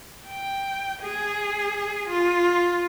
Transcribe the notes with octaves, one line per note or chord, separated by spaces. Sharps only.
G5
G#4
F4